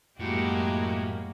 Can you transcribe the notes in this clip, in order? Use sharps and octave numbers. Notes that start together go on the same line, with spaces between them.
F#2 A2 G#3 A#3 F#4 G4